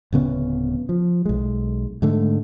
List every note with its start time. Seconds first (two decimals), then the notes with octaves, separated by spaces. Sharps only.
0.13 D1 C#3 B3 C#4
0.89 F3
1.26 B1 G#3
2.02 G#2 D3 A3